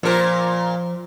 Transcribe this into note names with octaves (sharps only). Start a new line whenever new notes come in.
A#2 F3 A#4 C5